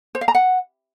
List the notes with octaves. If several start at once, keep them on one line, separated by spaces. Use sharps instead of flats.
C5
F5
A#5
F#5